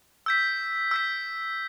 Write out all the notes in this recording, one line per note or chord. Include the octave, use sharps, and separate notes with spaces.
E6 G6 B6
E6 G6 B6